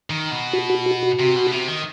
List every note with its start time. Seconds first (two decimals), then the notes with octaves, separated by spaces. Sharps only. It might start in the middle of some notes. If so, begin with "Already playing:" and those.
0.10 D#3
0.31 B2
0.53 F#4
0.70 F#4
0.86 F#4
1.03 F#4
1.19 C3
1.35 B2
1.51 C3
1.68 D#3